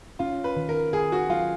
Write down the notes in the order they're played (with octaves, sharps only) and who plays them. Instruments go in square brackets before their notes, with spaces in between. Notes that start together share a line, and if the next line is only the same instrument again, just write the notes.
[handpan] C#4 [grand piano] F4
[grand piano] B4
[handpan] D#3
[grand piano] A#4
[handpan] D#3 [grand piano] G#4
[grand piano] F#4
[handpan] F#3 [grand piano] F4